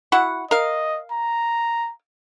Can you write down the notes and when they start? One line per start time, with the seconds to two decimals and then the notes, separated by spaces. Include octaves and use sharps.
0.12 E4 F#4 F#5
0.51 A#4 D#5 F5
1.12 A#5